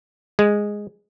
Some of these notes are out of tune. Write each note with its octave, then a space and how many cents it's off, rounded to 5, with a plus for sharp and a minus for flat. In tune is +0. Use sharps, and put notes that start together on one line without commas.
G#3 -5